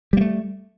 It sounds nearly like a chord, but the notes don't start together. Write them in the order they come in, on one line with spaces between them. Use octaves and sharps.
G3 A#3 A3